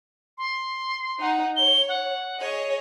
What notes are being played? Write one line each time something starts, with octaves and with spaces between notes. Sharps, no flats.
C6
D#4 F#5
C#5 G7
F#5
G#4 C#5 D#5